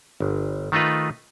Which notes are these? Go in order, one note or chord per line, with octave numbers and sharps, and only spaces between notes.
G1
D#3 A3 D#4 F4 B4